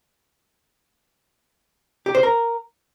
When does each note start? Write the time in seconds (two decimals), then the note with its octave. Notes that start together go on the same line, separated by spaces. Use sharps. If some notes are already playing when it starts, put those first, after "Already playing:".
2.06 G4
2.15 C5
2.23 A#4